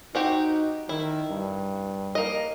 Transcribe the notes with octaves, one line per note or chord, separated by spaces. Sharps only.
C4 D#4 F#4 G4
D#3 E4
G2
A#3 D#5